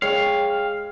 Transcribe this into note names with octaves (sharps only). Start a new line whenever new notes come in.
G#3 C#5 F5 G5